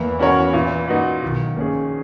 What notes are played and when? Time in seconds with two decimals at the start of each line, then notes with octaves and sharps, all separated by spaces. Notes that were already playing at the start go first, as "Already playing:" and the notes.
Already playing: E2 E3 A#3
0.19 C#4 F#4 A#4 C#5
0.53 A#2
0.88 A#3 D#4 F#4 B4
1.22 B1 B2 D#3
1.56 A#1 A#2 A#3 C#4 G#4